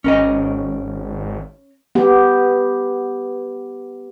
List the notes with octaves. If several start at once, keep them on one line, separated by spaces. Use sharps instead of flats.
G#1 C#4 A#4 D#5
B3 G4